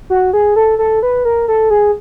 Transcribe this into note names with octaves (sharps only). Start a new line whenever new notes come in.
F#4
G#4
A4
A4
B4
A#4
A4
G#4